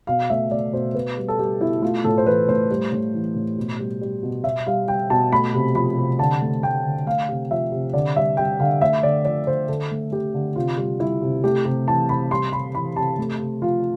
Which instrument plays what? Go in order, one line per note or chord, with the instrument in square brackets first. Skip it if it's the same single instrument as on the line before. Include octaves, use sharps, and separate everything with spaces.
[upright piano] B2 F5
A3 E5
A3 D5
B2 C5
B2 B4
G3
A4
G3 G4
B2 E4
A3 F4
A2 A4
C5
E3 B4
A2 C5
G3
A2
E3
A2
B2
G3
G3
B2
B2 E5
G3 F5
G3 G5
B2 A5
A3 B5
C3
F3 B5
C3
D3 A5
A3
A3 G5
D3
A3 F5
C3
F3 E5
C3
D3 D5
G3 E5
G3 G5
D3 F5
A3 E5
D3 D5
F3 D5
D3 C5
D3 A4
A3
A3 G4
D3
C3 F4
G3
G3 E4
C3
A3 G4
C3
E3 A5
C3 B5
G3 C6
C3 B5
E3 B5
C3 A5
A3
C3
F3 F4